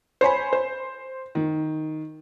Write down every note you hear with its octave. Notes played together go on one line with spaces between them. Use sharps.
C5 C#5 G#5 B5
C5
D#3